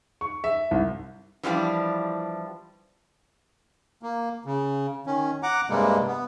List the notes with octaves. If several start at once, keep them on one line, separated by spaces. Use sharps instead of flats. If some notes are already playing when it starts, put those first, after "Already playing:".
C#6
E5
C2
E3 F3 G3 D4
A#3
C#3
D#3 C#4
F#5 A#5 D6
G2 C3 G3 G#3 A#3
B3